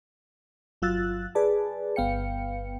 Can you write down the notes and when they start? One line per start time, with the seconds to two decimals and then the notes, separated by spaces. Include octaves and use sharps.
0.82 G1 F#3 F4 E6 F#6 A6
1.35 G#4 B4 D5 A5
1.96 G1 B3 F5 G5 C#7